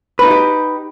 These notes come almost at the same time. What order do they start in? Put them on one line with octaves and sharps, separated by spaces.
B4 D#4 F4 G4